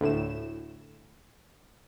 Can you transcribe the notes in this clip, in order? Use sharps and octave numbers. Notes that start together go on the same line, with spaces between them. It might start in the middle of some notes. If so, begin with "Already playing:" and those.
D2 A2 E7